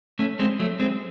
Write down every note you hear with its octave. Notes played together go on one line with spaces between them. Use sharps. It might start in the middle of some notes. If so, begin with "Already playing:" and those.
A3 C#4
G#3 C4
F#3 A3
G#3 C4